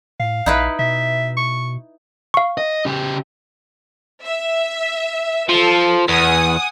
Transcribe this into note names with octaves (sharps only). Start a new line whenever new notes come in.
A2 F5
A#1 D#4 E4 B4
B2 E5
C#6
F5 C#6
D#5
C#3 G4
E5
F3 A4
E2 F#5 G#5 D#6